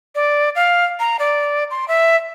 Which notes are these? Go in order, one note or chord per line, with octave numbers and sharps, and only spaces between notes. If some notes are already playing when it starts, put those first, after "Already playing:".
D5
F5
A#5
D5
C6
E5